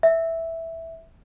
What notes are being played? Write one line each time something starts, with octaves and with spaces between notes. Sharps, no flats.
E5